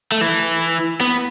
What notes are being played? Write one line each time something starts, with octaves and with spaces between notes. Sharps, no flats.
A3
E3
B3